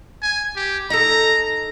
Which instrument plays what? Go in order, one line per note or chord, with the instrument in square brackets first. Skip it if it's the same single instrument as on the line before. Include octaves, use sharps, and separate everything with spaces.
[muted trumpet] G#5
G4
[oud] D#4 A4 [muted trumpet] A#5